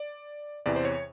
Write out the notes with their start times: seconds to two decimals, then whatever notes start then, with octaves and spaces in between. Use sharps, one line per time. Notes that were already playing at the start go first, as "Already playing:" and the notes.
Already playing: D5
0.66 E2 C3 E3 D5
0.76 C5
0.85 C#5